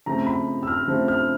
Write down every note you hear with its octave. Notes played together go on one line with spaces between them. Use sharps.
C#3 F3 A3 C4 A#5
B5
E6
F6
C#3 F3 A3 C4
F6